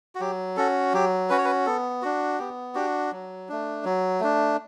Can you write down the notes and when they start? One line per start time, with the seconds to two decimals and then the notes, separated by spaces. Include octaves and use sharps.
0.15 F#4
0.20 F#3 G4
0.57 C#4 F#4 A4
0.94 F#3 G4
1.29 C#4 F#4 B4
1.38 C#5
1.45 B4
1.66 B3 A4
2.02 D4 F#4
2.39 B3 G4
2.75 D4 F#4 G4
3.12 F#3
3.49 A3 D4
3.85 F#3
4.20 A3 D4